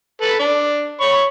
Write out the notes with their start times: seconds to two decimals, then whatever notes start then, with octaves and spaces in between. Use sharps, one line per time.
0.22 A4 B4 B5
0.39 D4
1.01 C#5 B5 C#6